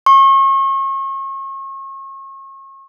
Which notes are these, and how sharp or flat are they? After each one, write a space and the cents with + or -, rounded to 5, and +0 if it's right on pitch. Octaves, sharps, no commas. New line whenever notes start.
C#6 -35